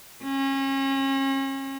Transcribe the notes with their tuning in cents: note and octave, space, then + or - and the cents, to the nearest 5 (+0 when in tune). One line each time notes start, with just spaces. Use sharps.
C#4 -35